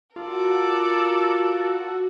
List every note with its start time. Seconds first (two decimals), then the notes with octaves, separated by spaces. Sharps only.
0.16 F4 F#4 A4 A#4 D5